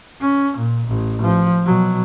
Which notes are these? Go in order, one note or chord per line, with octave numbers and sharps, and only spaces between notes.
C#4
A#2
A1
F3
B2 F#3